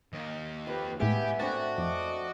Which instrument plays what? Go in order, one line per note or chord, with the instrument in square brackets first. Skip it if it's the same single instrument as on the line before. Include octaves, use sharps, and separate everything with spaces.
[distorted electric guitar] D#2 D#3
[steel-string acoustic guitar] F2 [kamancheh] G4 B4
[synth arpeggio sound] A2 G#3 [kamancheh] B3 G#5 [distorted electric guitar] G4 [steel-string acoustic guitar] E5
[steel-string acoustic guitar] A3 C4 D4 [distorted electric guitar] F#4 [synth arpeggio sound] A6
[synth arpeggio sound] F2 [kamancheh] D#5 D6